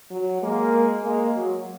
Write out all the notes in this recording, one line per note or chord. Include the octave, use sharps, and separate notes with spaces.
F#3
G#3 A#3
G#3 A#3
F#3